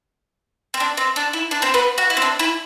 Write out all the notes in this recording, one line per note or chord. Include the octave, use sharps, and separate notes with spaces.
C4
D4
C4
D4
E4
D4
C4 C5
B3 B4
F#4
E4
C4
D4
E4